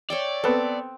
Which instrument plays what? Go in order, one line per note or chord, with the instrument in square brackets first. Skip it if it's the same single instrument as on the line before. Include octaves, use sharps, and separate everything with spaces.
[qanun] C#5 E5 G5 [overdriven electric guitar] D5
[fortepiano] B3 A4 [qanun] C4